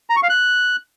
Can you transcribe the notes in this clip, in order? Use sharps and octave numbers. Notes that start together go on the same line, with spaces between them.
A#5
C#6
F5
F#6